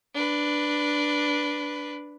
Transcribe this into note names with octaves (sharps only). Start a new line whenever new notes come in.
D4 B4